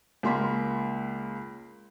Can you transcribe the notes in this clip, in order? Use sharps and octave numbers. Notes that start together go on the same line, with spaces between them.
C#2 A#3 C6 B6